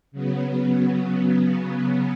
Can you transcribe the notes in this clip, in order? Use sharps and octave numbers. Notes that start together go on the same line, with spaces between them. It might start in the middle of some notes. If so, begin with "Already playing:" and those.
C#3 F#3 B3